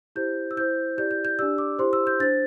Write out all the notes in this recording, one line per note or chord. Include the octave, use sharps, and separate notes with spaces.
E4 G4 C5 G6
E6
E4 C5 G6
E4 G4 D5 G6
G6
G6
D4 G4 D5 E6
D6
E4 G4 C5 C6
E6
G6
D4 C5 A6